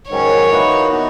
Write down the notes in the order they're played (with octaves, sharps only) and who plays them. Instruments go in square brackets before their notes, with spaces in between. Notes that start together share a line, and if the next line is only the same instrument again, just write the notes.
[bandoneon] G#2 D#3 F#3 C#4 [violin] C#5
[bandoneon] E3 A#3 D#4 F#4 B4
E3 B3 D#4 F#4